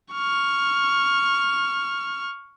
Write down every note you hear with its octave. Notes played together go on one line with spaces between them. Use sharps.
C#6 F6